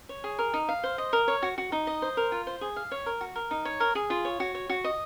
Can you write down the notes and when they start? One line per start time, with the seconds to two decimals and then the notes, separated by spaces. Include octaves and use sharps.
0.09 C#5
0.24 G#4
0.39 A#4
0.54 D#4
0.69 F5
0.84 C5
0.98 D#5
1.13 A#4
1.28 C#5
1.43 F#4
1.58 F#4
1.72 D#4
1.87 D#5
2.02 C5
2.17 A#4
2.32 F4
2.47 C5
2.61 G#4
2.76 F5
2.91 C#5
3.06 A#4
3.21 F#4
3.36 A#4
3.51 D#4
3.65 C#5
3.80 A#4
3.95 G#4
4.10 F4
4.25 C#5
4.40 F#4
4.55 C#5
4.70 F#4
4.84 D#5